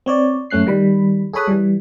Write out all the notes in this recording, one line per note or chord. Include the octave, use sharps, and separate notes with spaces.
C4 C#5 D5
F#2 A3 C#4 F#6 C7
D#3 G3 B5
G#4 A4 C#5 B5 D#6 F#6
E3 G3